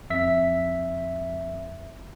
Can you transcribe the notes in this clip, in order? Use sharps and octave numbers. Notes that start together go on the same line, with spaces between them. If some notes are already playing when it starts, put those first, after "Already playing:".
F2 E5 B6